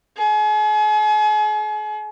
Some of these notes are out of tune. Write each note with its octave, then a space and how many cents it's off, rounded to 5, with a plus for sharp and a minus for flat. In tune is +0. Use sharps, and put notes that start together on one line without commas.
G#4 +40